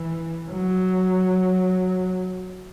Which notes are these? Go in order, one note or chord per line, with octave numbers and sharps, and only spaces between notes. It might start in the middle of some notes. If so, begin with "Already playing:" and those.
Already playing: E3
F#3